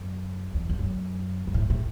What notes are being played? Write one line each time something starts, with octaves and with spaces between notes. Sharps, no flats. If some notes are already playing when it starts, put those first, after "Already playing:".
Already playing: F#2
E2
E2
F#2
F#2
A2
A2